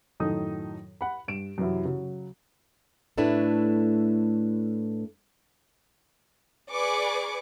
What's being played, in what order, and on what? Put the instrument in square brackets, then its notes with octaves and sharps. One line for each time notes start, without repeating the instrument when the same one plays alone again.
[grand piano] F#2 A2 D#3 D#4 A4 D#6
F#5 B5
G2 D7 E7
F#2 C3 E3 F#3 E4
C#3 F#3
[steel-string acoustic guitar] A2 A3 D4 E4 B4
[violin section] G#4 B4 D5 C#6 D6